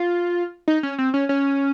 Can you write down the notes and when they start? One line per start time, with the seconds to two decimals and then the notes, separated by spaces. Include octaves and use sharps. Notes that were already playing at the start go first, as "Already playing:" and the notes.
Already playing: F4
0.68 D#4
0.83 C#4
0.98 C4
1.14 C#4
1.29 C#4